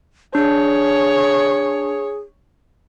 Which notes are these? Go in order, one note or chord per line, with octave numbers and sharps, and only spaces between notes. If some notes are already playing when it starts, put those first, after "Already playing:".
D4 G#4 C#5